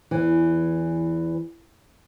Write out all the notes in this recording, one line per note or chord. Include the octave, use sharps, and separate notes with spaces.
E2 E3